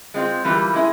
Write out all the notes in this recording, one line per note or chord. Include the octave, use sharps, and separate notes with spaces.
G#3 C4 F4
E3 G3 A#3 F4
G#3 E4 G#4